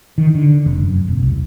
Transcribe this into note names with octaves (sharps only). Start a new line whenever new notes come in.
D#3
D3
F1
F#2
E1
C2